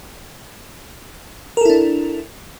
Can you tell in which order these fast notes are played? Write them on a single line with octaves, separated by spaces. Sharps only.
A#4 A4 E4 D4